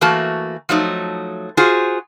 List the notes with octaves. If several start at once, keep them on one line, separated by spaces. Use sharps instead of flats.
E3 A3 A#3 F#4 A5
F3 F#3 A3 D#4
F4 F#4 G#4 C5